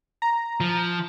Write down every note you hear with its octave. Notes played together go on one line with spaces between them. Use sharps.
A#5
F3